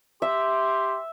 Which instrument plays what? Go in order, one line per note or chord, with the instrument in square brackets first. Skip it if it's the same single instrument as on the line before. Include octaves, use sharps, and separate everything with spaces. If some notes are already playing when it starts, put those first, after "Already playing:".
[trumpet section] G4 C6 [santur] E5